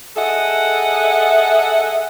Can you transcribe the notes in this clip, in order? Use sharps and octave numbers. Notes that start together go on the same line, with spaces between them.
G#4 A4 D#5 E5 F#5